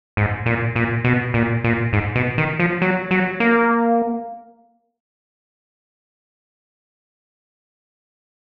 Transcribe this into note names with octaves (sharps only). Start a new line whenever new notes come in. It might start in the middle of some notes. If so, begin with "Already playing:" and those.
G#2
A#2
A#2
B2
A#2
A#2
G#2
B2
D#3
F3
F#3
F#3
A#3